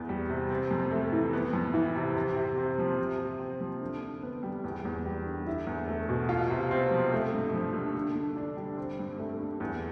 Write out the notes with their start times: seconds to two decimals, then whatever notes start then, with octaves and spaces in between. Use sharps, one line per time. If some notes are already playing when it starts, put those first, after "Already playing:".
Already playing: E2 B3
0.09 G3
0.29 C3
0.50 C4
0.71 F2
0.91 A3
1.12 E3
1.33 B3
1.53 F2
1.74 E3
1.96 C3
2.15 C3
2.36 C3
2.57 C4
2.78 F3
2.98 C3
3.19 C3
3.39 C4
3.61 F3
3.81 D3
4.02 D3
4.23 B3
4.43 G3
4.64 E2
4.85 E2
5.05 G3
5.26 D3
5.47 E4
5.67 E2
5.88 A3
6.09 B2
6.29 F4
6.50 C3
6.71 C4
6.91 F3
7.12 A3
7.32 G2
7.53 F3
7.74 D3
7.94 D3
8.15 D3
8.36 D4
8.57 G3
8.77 C4
8.99 G2
9.19 A3
9.40 D3
9.60 E2